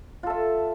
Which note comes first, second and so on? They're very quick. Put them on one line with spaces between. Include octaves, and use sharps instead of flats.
F4 A4 E5